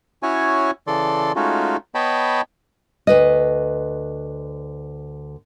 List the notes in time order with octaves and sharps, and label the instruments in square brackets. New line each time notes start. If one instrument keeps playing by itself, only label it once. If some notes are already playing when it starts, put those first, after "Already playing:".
[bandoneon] C#4 E4 F#4 C#5 G#5
C#3 E3 A4 D5 C6
G#3 A3 C#4 D#4 F4 F#4
B3 C#5 D#5 G5 A5 B5
[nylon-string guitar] D2 B4 D#5